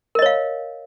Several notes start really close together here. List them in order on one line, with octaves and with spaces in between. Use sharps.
A#4 D#5 C#5 F5